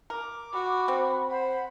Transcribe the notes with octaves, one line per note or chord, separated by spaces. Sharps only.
A#4 D6
F#4 B5
C4
C5 F#5 B5